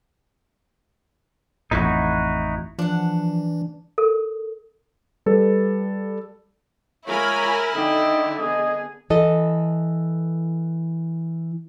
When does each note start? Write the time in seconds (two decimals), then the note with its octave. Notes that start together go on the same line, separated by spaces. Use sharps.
1.71 A1 F2 A2 D#4 E4 F#4
2.79 E3 F3 D4 F#5
3.98 A4 A#4
5.26 G3 A4 B4
7.07 G#3 E4 F4 A#4 C#5 G#5 B5
7.75 D3 D#4 D#5 G5
8.39 B3 G#4 D#5
9.10 E3 A4 D#5